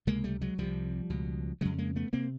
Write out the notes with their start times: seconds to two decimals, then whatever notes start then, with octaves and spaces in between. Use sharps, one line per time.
0.07 C#2 C3 G#3 A#3
0.24 G3 A3
0.41 F#3 G#3
0.58 C2 C3 F3 G3
1.10 C#2 B2
1.61 F2 C#3 F#3 G#3
1.78 G#3 A#3
1.96 A3 B3
2.13 C3 A#3 C4